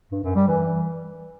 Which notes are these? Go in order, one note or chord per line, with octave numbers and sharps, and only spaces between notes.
G2
F#2
G3
E3